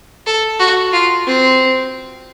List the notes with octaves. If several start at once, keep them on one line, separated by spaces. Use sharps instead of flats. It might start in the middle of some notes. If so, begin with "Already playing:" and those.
A4
F#4
F4
C4